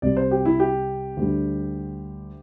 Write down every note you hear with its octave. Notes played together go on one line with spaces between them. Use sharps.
C2 C3 G3 D5
C5
G4
E4
G4
D2 D3 G3